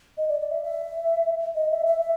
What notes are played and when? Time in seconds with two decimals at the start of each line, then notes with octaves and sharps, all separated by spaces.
0.17 D#5
0.29 D5
0.41 D5
0.51 E5
0.63 E5
1.55 D#5
1.71 E5
1.86 E5
2.01 E5